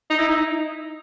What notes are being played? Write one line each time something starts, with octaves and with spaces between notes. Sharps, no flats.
D#4
E4
D#4